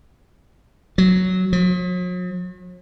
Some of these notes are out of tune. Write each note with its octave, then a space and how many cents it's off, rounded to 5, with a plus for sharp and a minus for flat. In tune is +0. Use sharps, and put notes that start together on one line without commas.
F#3 +0
F#3 -45